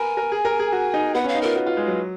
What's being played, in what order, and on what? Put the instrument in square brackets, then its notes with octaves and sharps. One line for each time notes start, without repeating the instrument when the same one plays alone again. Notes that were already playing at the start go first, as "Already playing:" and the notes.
Already playing: [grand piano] A#4 B4 [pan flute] G#5
[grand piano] A#4
G#4
A#4
G#4
F#4
D#4
[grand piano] B3 [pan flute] F#5
[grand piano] C#4 [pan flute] F5
[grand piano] D#4
[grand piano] F4 [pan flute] A#4
[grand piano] F#4
F4
G#3
F#3